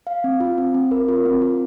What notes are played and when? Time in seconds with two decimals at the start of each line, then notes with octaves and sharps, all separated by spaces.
0.07 F5
0.24 C4
0.40 F4
0.58 C4
0.74 C4
0.91 A#4
1.09 F4
1.25 C4
1.42 F4